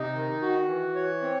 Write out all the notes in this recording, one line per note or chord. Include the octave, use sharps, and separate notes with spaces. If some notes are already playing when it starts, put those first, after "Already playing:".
Already playing: C3 D#4
D#3
F#4
E3
C#5
C4